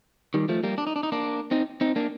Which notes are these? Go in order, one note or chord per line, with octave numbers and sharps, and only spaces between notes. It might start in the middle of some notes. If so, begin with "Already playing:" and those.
D#3 G3
F3 A3
G3 A#3
D4
D#4
D4
D#4
A#3 D4
C4 D#4
C4 D#4
A#3 D4